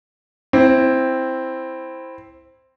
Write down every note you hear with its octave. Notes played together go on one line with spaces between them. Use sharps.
C4 E4